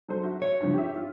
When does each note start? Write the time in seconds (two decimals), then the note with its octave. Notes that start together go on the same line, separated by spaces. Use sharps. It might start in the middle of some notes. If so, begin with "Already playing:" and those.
0.08 F#3 A4 C5
0.23 F#4 E5
0.42 C#5
0.61 G2 C#3 F3
0.73 G4 E5
0.96 F4